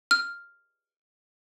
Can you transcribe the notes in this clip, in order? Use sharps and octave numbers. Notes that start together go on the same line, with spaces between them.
F6